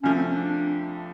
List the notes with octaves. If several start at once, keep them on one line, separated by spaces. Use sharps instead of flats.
C2 C3 F3 A3 C#4
C4
C#4
D4